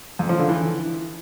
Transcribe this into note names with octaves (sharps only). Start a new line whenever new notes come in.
F2
F3
D3
E3